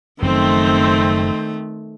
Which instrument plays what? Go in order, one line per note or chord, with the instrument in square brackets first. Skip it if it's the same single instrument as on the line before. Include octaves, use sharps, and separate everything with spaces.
[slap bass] F#1 F#2 F3 [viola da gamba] D#3 A3 [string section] C4